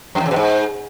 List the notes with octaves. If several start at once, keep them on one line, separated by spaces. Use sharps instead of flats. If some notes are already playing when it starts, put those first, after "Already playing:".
F#2
E2
C#3
B2
G#2